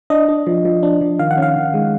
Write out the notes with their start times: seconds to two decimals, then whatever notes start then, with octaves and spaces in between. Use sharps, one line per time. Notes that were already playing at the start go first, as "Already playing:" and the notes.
0.10 D4 D#5
0.29 D4
0.47 F3
0.65 F3
0.83 D4
1.01 F3
1.19 D#3 F5
1.31 F#5
1.37 C#4
1.42 F5
1.56 D#3
1.74 G#3